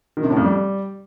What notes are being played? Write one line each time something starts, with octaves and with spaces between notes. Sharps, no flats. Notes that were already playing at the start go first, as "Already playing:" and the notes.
D#3
C3
A2
F2
G3